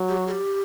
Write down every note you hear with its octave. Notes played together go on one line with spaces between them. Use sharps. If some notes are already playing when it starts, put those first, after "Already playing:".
Already playing: F#3
G4
F#4
G#4
G4